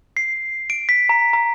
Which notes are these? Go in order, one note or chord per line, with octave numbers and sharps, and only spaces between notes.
C7
D7
B6
A#5
A#5